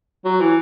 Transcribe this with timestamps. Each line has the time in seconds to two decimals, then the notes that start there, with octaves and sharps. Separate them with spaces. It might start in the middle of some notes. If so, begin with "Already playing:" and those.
0.25 F#3
0.40 E3